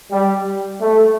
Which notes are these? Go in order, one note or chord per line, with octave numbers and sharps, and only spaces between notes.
G3
A3